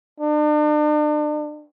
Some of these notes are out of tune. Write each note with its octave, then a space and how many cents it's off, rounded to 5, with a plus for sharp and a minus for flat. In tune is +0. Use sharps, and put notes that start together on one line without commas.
D4 +40